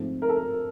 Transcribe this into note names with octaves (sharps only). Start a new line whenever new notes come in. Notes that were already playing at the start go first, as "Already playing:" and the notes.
Already playing: G#2 F3 A3 C4
A#4
A4
A#4